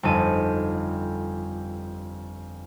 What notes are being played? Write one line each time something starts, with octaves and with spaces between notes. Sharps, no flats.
G1 F2 D#4 A4 D#7